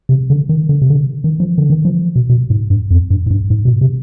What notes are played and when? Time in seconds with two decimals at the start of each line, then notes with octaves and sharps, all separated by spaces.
0.09 C3
0.30 D3
0.49 D#3
0.69 D3
0.82 C3
0.90 D3
1.24 D#3
1.40 F3
1.58 D3
1.70 D#3
1.85 F3
2.16 B2
2.30 B2
2.50 G#2
2.70 G2
2.91 F2
3.10 G2
3.26 G#2
3.30 G2
3.50 G#2
3.65 B2
3.81 C3